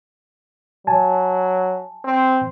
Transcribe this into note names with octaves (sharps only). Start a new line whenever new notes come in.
F#3 G#5 A5
C4